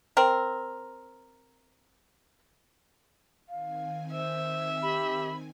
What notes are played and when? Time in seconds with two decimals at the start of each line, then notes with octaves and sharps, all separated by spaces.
0.17 C4 A#4
3.49 D#3 C4 F5 G#5
4.12 C5 E5
4.82 G4 B5